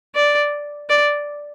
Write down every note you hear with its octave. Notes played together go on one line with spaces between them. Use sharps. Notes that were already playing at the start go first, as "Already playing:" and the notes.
D5
D5